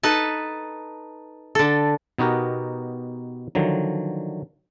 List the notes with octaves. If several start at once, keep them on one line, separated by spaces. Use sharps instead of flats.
D#4 A4 B4 A5
D3 A4
B2 B3 D#4 F#4 G4 A#4
D3 D#3 F3 F#3